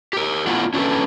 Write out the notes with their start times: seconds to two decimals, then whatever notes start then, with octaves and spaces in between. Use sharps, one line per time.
0.13 G4 A#4
0.47 A3 B3 D4 E4 F4 F#5
0.74 C#4 D4 F#4 G4 A4 B4